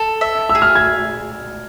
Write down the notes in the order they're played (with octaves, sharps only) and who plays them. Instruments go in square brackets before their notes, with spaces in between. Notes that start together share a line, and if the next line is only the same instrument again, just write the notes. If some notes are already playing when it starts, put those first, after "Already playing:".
Already playing: [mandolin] A4
E5
[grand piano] E6
[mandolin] G#4
[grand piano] F6
G#6